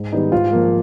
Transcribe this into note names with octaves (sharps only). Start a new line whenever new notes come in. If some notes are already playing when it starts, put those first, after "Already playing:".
Already playing: G#2
D#3 G3 B3 D#4
G#2 F4
F3 A#3